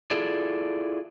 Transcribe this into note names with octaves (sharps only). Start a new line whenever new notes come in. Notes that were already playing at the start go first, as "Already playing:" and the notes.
E4 F4 G#4 A4 D5